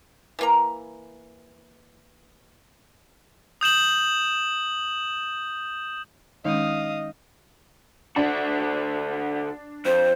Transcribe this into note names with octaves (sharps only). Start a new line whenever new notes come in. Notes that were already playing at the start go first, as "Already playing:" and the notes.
E3 A#3 A#5
D#6 G6 E7 F#7
D#3 G#3 C#4 D#4 D#5 F5 D#6
D3 D4 F#4
F2 C5